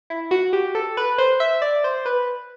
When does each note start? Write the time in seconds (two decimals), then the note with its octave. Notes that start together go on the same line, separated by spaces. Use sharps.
0.10 E4
0.31 F#4
0.53 G4
0.75 A4
0.97 B4
1.18 C5
1.40 E5
1.62 D5
1.84 C5
2.05 B4